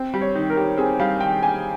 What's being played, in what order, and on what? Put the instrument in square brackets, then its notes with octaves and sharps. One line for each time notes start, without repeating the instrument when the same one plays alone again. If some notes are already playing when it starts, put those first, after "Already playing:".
Already playing: [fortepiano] C4 [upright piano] C5
[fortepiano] G3
[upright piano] C#5
[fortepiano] D#3
[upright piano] A#4
[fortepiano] G4
[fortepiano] C4 [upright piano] G#4
[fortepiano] G3 [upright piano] F5
[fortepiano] D#3 [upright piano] G5
[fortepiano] G4 [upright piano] G#5